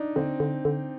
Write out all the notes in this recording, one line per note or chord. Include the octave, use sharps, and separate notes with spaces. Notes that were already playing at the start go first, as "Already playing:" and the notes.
Already playing: D4 D#4
D3 C4
D3
D3